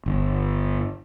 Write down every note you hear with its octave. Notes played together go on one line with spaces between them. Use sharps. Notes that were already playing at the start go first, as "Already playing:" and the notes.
G1